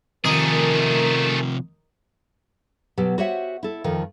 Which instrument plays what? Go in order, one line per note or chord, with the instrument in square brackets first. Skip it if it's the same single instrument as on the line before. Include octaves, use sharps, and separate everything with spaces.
[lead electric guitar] C3 F3 [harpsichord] D#3 [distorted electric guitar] A3 G#4 [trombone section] A#4
[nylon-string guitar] B2 F#3 G4
F#4 G4 C5 C#5 E5 F#5
E4 A4
F2 D#3 F3